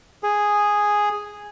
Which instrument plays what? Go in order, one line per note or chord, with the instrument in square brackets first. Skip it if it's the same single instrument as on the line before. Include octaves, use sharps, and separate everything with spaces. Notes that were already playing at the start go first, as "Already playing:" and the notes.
[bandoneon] G#4